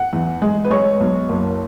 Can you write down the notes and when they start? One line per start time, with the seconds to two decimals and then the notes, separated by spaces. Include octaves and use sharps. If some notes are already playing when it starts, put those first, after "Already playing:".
Already playing: F#5
0.13 E2
0.42 G#3
0.64 B4
0.70 G#3 C#5
1.00 B1
1.29 F#1